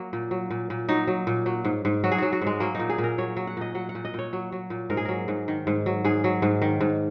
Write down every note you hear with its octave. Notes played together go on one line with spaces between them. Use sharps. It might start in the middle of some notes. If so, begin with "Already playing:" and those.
Already playing: F#3 A#3
A#2
F#3
A#2
A#2
F#3 D#4
F#3
A#2
F#3
G#2
G#2
F#3 F#4
G#4
F#3 F#4
F#4
G#2 G#3
F#3 A#3
A#2 D#4
G#4
A#2
A#4
F#3 C#5
F#3
F#5
A#2 D#5
F#3 F#5
F#5
A#2
D#5
A#2 C#5
F#3
F#3
A#2
G#2 A#4
G#4
F#3 A#4
G#2
D#3
G#2
F#3
G#2 G#4
F#3
G#2
D#3
G#2